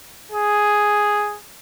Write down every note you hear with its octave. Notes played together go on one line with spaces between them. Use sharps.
G#4